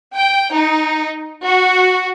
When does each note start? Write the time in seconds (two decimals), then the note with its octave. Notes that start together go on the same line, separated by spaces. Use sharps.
0.15 G5
0.51 D#4
1.46 F#4